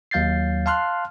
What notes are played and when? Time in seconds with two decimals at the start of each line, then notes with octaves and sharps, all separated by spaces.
0.11 D#2 F#3 F5 G6 A6 C7
0.66 F5 A5 C6 F6 F#6